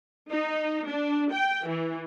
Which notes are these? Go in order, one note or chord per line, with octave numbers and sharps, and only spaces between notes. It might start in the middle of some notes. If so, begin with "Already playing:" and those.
D#4
D4
G5
E3